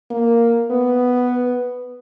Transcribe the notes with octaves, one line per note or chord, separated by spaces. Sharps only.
A#3
B3